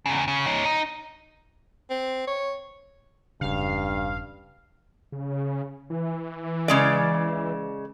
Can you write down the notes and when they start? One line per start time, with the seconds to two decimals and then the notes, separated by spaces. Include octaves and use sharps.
0.06 E2 C#3
0.28 C#3
0.46 D#4 C#5
0.65 D#4
1.90 C4
2.27 C#5
3.41 E1 G2 C#3 F5
5.12 C#3
5.90 E3
6.68 C#3 G#3 D5